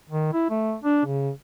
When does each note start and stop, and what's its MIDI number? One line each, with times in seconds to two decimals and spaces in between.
0.10 0.31 51
0.33 0.45 64
0.50 0.75 57
0.84 1.05 62
1.05 1.30 49